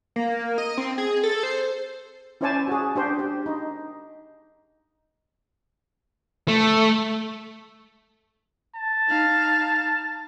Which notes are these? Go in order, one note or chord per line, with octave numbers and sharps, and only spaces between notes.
A#3
D#5
C4
G#4
A4
C5
C#4 E4 C5 D5 G#5 A5
F#4 G#4
D4 G4 C5
G4
D#4
A3
A5
D#4 F5